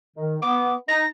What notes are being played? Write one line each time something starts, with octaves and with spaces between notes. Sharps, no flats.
D#3
B3 D6
D#4 A#6